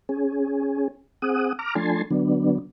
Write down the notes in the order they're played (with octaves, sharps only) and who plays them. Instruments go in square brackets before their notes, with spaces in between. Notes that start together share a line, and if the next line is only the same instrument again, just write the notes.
[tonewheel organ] C#4 G#4
C4 G#4 F#5 D#6
A#5 D6 F6
F3 A3 D4 G#5 A5 C6
D3 F#3 B3 D4